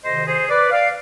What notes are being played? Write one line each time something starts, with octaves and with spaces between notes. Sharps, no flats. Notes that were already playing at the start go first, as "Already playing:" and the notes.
D2 C3 D#3 C5 D#5
G#4 C5
B4 D5
D5 F5